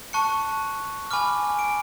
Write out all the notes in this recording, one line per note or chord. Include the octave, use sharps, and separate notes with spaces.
A5 C#6 F#6 C#7
G#5 B5 D6 F6
D7